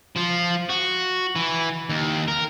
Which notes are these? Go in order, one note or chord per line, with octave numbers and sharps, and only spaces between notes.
F3 F4
F#4
E3
D#2
A#4